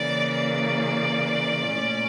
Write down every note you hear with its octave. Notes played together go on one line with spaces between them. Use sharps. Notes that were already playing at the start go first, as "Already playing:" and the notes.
Already playing: C#3 E3 A#3 D5
D5
A#2 A3 C#4